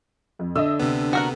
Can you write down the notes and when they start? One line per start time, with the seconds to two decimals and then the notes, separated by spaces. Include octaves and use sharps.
0.39 F2
0.56 D3 D#5 E5 E6
0.80 D2 C3 B3
1.13 F#4 A#4 F#5